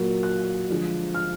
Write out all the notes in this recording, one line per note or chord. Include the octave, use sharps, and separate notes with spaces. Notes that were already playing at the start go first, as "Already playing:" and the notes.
Already playing: A#2 F#3 A#3
F#6
D3 F3 G#3
F6